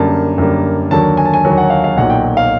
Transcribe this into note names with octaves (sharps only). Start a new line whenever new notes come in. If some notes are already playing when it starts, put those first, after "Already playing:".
Already playing: F#2 D3 G3 A#3 A5
F#2 D3 G3 A#3
D#2 D3 F#3 A#3 A5
G#5
A5
G#5
D#2 D3 F#3 A#3
F#5
F5
F5
B1 A#2 F#3 F#5
G5
F5